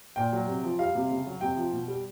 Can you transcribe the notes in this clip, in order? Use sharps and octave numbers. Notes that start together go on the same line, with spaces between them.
A#2 G5
F#3
C3
F3
G3 F5
C3
C#3
F#3
C3 G5
F3
B2
G3